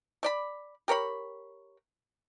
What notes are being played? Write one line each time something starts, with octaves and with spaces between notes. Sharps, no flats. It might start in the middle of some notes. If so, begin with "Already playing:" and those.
A3 D5 B5
G4 A#4 C#5 B5